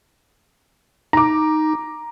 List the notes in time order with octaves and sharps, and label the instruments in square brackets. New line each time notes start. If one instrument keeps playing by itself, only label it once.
[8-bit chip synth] D#4 [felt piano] A#5 D6